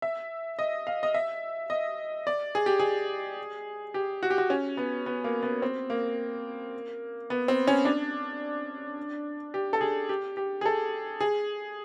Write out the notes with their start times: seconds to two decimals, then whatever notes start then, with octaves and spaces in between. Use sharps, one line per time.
0.02 E5
0.59 D#5
0.87 F5
1.03 D#5
1.14 E5
1.70 D#5
2.27 D5
2.55 G#4
2.66 G4
2.80 G#4
3.94 G4
4.23 F#4
4.30 G4
4.38 F#4
4.50 C#4
4.77 B3
5.06 B3
5.24 A#3
5.43 B3
5.62 C4
5.90 A#3
7.30 B3
7.48 C4
7.67 C#4
7.85 D4
9.54 G4
9.73 A4
9.81 G#4
10.09 G4
10.37 G4
10.61 G#4
10.66 A4
11.21 G#4